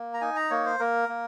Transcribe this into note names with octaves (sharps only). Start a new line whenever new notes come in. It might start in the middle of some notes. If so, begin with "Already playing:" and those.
Already playing: A#3
A#5
D#4 G#5
A#5
A#3 C#5
C5
A#3 A#4
A#3